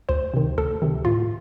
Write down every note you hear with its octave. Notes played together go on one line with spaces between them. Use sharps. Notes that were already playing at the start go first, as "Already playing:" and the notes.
D2 C5
C3 D#3
D2 A4
C3 D#3
A2 F4